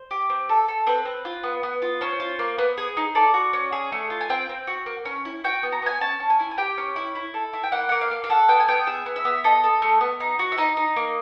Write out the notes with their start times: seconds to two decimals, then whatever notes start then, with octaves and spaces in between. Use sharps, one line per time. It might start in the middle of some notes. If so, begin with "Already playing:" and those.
Already playing: C5
0.11 G4
0.30 C4
0.49 A4
0.68 A4
0.87 C4 B4
1.05 C4
1.25 F4
1.44 B3
1.63 B3
1.82 F4
2.01 C#4 C5
2.20 F4
2.39 A#3
2.58 B3
2.78 G#4
2.97 D#4
3.15 A4 D5
3.34 F#4
3.53 C#4
3.72 G#4
3.92 A3
4.10 F4
4.21 G#5
4.30 C4 G5
4.49 C4
4.67 F#4
4.86 A#3
5.05 C#4
5.25 E4
5.44 F#4 G5
5.63 B3
5.72 A#5
5.82 B3 G#5
6.01 C#4 A5
6.20 C#4
6.30 G#5
6.39 E4
6.51 G#5
6.58 G4 G5
6.78 C#4
6.96 E4
7.15 E4
7.34 A4
7.53 E4
7.63 G5
7.72 A#3 F#5
7.89 A#3 F#5
8.01 F5
8.11 A#3
8.24 F5
8.30 A4 F#5
8.48 B3 G5
8.60 G#5
8.68 B3 G5
8.87 G#4 E5
9.06 B3
9.16 E5
9.25 B3
9.44 A4 D#5
9.64 A4
9.82 A3
10.01 B3
10.20 D#4
10.39 F#4
10.52 E5
10.58 D#4 D#5
10.77 D#4
10.96 A#3